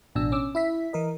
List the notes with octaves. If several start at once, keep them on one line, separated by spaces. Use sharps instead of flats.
A1 B2 D4 E6
C#4 D6 E6
E4 E5 B6
E3 A#4 D#5